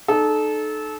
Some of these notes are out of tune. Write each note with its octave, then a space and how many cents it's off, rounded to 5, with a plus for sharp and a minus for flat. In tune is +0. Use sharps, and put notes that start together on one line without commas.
D#4 -35 A4 -25